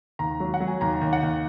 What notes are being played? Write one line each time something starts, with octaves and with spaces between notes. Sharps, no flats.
D#2 A#5
F#3
F#5
F#3
G#5
D#2 A#5
D#2
F#5
D#2